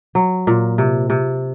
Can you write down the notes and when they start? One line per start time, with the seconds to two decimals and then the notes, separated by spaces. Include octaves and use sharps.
0.15 F#3
0.47 A#2
0.78 C3
1.10 C3